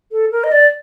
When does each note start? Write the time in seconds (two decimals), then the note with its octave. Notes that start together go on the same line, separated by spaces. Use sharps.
0.12 A4
0.32 A#4
0.44 D#5
0.52 D5